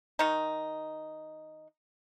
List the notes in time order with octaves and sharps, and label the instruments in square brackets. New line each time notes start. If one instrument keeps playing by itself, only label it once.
[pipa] D#3 D#4